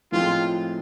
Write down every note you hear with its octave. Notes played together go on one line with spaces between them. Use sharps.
A2 F3 G#3 C4 F4